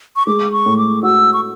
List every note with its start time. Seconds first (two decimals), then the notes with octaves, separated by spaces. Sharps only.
0.16 C#6
0.27 G#3 D6
0.52 C#6
0.66 A2
0.78 D6
1.03 F#4 E6
1.33 C#6